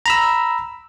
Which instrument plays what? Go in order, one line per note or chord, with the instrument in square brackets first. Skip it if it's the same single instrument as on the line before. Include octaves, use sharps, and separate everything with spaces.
[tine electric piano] A#5 B5 E6